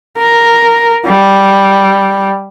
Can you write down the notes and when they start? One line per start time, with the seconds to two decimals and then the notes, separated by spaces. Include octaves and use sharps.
0.18 A#4
1.06 G3